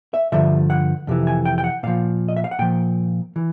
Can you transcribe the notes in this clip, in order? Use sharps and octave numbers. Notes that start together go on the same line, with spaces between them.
E5
G2 D3 F3 E5
F#5
F2 C3 E3
G#5
G5
G5
F#5
A#2 F3 F5
D#5
E5
F5
F#5
A#2 F3 G5
E3